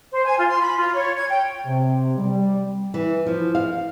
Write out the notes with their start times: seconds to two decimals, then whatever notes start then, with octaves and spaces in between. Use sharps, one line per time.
0.13 C5
0.25 G#5
0.38 F4
0.49 C6
0.61 B5
0.78 F4
0.94 C#5
1.17 G#6
1.29 G5
1.65 C3
2.17 G3
2.94 E3
3.26 F3
3.55 F5